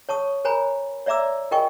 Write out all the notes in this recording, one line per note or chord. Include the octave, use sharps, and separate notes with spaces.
C#5 A5 C#6 D#6
A#4 C5 C#5 G#5 A#5 B5
C#5 D5 E5 A#5 D6 E6
F4 A#4 D#5 G5 G#5 C#6